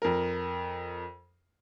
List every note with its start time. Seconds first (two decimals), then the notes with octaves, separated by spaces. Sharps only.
0.02 F2 A#4